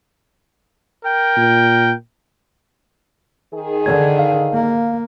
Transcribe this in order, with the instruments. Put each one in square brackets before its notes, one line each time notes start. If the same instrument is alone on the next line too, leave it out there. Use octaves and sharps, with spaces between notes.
[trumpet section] A#4 G5
[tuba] A#2
[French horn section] D#3 G#4
[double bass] D3 [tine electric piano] G#6
[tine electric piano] F5
[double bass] A#3